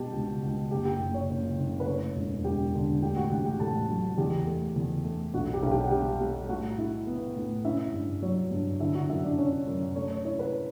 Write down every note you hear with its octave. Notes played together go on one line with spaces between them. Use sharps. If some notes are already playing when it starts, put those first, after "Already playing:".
Already playing: B2 G3 G4 G5 A5
C#2
C#2
F#1 G4 G5
G4 G5
F#1
C#5
F#1
F#1
B4
A3 C#5
E1
E1 G4 G5
D3
A2 G4 G5
F#4 F#5
A1 G4 G5
G4 G5
A1 A4 A5
F#3
E2 G4 G5
A3
E2
A3
B1 F#4 F#5
G4 G5
B1
G4 G5
F#5
G3 G4 G5
G3
A2 F#4 F#5
E4
B3
A2
C#4 E4 E5
G2
F#3 C#5
G2
D3 E4 E5
F#4 F#5
F#2 E4 E5
D4 D5
C#4 C#5
F#2
A3 C#5
C#5
E4 C#5
B4